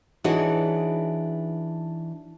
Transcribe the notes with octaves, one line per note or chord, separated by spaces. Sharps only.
E3 D4 D#4 F#4 G#4 C#5